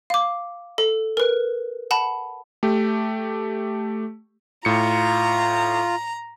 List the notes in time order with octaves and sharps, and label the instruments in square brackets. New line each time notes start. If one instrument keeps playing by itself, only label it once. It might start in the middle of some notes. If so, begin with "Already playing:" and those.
[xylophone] F5 D6
A4
A#4 B4
F#5 A5 B5
[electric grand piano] A3 G4
[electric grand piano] A2 C#7 [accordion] F4 [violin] A#5